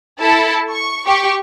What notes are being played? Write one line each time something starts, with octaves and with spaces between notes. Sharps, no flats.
E4 A4 A5
C#6
G4 C#6